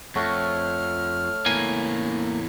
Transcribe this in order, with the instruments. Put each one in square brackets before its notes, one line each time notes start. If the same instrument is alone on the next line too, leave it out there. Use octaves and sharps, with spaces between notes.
[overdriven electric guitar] F2 [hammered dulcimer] A3 C#5 F#5 [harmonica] F6
[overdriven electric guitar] E2 A2 [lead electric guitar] A#3 G#5